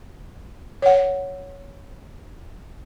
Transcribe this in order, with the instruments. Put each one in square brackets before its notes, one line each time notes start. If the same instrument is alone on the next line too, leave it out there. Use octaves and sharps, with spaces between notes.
[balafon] C#5 F#5